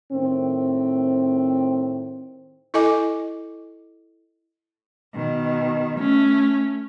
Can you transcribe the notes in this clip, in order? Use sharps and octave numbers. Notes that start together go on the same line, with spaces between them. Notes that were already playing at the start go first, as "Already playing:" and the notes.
A2 D#3 C4
E4 A4 D#5 G#5 D6
B2 D#3
A3 C#4